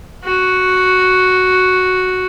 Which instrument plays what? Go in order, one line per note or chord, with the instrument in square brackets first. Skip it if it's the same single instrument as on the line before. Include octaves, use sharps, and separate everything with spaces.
[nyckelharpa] F#4